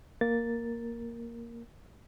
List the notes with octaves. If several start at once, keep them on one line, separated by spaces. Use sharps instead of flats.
A#3 A#4 A6